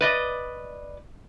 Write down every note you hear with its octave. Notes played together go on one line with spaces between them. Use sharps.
B4 D5 D#5